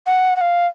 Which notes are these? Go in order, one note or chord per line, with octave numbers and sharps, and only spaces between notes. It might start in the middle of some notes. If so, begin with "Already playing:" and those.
F#5
F#5
F5